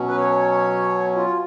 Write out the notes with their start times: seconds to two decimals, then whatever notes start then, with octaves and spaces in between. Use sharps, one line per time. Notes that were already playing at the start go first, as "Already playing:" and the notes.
Already playing: B2 F#3 C#4
0.08 B4
0.17 C#5
1.15 F4